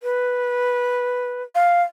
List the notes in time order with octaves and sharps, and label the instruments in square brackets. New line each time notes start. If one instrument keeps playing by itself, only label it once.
[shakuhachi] B4
[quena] F5